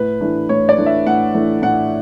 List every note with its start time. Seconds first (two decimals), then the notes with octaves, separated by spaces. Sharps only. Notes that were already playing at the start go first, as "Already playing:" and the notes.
Already playing: A2 B4
0.20 E3 A3 D4
0.49 A2 C#5
0.69 D5
0.77 E3 A3 D4
0.86 E5
1.06 A2 F#5
1.34 E3 A3 D4
1.62 A2 F#5